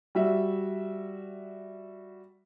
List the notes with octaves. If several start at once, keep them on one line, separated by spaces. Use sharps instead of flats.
G3 F#4 E5